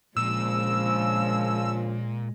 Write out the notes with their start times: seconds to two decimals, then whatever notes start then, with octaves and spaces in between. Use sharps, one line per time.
0.17 A#1 A#2 C#3 F3 G#3 E6